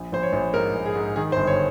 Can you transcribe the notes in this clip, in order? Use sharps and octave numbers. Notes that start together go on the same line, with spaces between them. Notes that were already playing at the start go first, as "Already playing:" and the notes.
Already playing: A#1
A#1 C5
C#5
A#1
G#2 A#4
A#1
G#4
G#2
D#3 G#4
C5
G1
C#5